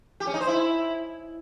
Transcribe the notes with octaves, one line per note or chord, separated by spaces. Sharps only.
G4
C#4
D#4
C5
E4